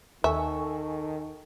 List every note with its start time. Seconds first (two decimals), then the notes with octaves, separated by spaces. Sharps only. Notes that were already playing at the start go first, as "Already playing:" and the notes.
0.24 D#2 D#3 A4 E5 G#5 C#6